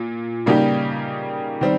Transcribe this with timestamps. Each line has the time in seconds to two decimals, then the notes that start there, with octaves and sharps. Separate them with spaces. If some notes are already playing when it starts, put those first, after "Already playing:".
Already playing: A#2
0.46 C#3 G3 A#3 D#4 G4
1.61 D#3 G3 C4